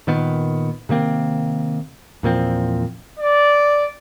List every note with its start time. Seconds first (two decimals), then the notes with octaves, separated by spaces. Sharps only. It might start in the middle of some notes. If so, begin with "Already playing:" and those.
0.07 A#2 D#3 B3
0.89 C3 D#3 A#3 C4
2.23 E2 A#2 F3 C4
3.20 D5